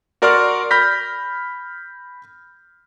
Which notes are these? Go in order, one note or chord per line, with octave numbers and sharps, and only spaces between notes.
F#4 A#4 D5 C6 C#6 F6
B5 F6 G6 A#6 B6